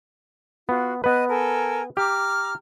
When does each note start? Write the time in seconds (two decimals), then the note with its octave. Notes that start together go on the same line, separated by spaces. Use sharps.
0.69 B3 F4 F#4
1.04 B3 B4 D#5 F#6
1.29 A4 A#4 G#5
1.97 G4 A#5 D6 F6